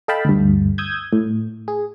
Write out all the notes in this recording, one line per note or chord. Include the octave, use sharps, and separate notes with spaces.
A4 D#5 F5 G5 A5 B5
D2 G2
D#6 E6 G6 G#6
A2
G#4